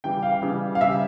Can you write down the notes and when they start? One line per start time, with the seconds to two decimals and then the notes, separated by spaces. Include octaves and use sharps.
0.04 C#3 E3 G3 G5
0.23 F5
0.42 C#3 E3 G3
0.75 F5
0.81 C#3 G3 E5